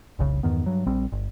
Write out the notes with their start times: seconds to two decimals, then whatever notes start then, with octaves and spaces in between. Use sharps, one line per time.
0.19 F1 C2 C#3
0.43 E2 G2 D#3 B3
0.66 G2 F#3
0.87 A#1 G3 C4
1.12 G1